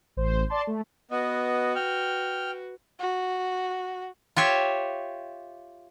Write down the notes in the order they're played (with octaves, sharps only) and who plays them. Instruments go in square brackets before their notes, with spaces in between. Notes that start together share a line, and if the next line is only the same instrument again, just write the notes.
[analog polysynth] A1 C5
D5 A5 C6
A3
[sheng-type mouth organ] B3 D#5 [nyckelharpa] F#4 B4
[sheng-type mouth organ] G5 F6
[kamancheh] F#4
[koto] F4 G4 C#5 E5